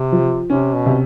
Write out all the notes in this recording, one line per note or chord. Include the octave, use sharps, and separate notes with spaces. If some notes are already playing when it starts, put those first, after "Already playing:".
Already playing: C3
F3
C3 C#4
B2
C3